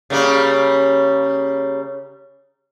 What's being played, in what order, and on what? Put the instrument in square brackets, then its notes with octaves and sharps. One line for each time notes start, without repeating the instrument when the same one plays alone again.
[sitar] C#3 G3 A#3